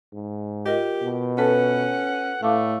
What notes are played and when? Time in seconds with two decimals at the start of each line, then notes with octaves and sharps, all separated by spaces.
0.13 G#2
0.66 F4 G4 A#4 D#5
1.02 B2
1.38 C#4 A4 B4 F#5 A5
2.43 A2 A3 F5 D6